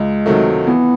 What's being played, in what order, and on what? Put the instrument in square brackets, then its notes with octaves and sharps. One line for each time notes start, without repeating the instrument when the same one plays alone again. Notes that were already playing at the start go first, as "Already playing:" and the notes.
Already playing: [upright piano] C#2 [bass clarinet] G#3
[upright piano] C3 D#3 F#3 A3
[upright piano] E3 [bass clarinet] B3